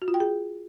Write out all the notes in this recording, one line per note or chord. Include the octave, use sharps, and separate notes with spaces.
F#4
F4
G5
G#4